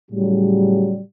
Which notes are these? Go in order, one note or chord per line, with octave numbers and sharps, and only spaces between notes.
A2 C#3 F#3 G3